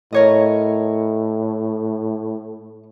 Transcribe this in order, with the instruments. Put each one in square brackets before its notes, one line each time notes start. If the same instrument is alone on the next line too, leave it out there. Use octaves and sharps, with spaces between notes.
[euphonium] A2 [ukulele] A#4 C#5 D#5